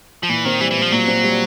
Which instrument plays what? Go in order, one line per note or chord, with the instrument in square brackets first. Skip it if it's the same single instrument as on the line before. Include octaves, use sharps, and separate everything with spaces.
[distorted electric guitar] F3
[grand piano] A#2 [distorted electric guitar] E3
[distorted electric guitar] D#3 [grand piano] C4
[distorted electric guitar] E3 [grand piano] G3
[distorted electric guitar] E3
[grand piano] A#2 [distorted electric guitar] F3
[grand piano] A#2 [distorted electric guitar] F#3
[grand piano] C4
G3